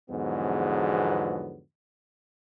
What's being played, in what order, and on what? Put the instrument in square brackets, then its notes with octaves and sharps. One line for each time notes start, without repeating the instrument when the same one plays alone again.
[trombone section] E2 G#2 D3 F3 F#3 B3